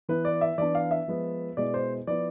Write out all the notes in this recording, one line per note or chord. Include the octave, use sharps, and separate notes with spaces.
E3 B3 E4 B4
D5
E5
E3 B3 D4 D5
F5
E5
F3 G#3 B3
B2 G#3 B3 E4 D5
C5
F3 B3 E4 D5